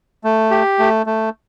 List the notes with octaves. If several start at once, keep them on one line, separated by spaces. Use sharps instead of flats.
A3
G4
A3
A3